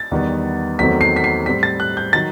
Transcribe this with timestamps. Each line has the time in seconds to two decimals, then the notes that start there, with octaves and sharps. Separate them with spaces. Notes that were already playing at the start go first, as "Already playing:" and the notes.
Already playing: A6
0.11 E2 D#3 G3 B3
0.79 E2 D#3 F#3 A3 C4 B6
1.01 C7
1.16 B6
1.24 C7
1.46 A2 G3 C4 B6
1.63 A6
1.80 F#6
1.97 G6
2.13 D#3 F#3 A6